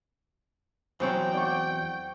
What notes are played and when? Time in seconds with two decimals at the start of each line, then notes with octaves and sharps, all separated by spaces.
1.00 E2 F#3 C4 C5 C#5 G5
1.33 D5 F#5 C#6